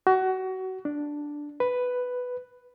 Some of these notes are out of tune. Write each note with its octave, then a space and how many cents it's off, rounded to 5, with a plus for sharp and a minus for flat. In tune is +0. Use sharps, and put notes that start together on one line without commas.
F#4 +25
D4 +0
B4 +5